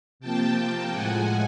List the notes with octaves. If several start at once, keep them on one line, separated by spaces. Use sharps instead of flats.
C3 F3 A#3 G5 A5
G5 A5
A2 F3 G#3 F#5 G#5